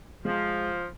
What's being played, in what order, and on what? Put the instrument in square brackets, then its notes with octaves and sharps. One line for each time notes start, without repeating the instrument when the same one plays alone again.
[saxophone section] F3 [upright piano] G#3